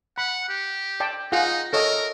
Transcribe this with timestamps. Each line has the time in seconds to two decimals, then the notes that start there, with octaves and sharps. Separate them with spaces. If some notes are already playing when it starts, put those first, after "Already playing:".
0.18 F#5 B5
0.49 G4
1.00 D5 G5 A5
1.32 D#4 F4 G#4 F#5
1.73 A4 A#4 C#5 D#5